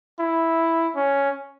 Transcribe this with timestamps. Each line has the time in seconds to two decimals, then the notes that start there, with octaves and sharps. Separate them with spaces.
0.20 E4
0.96 C#4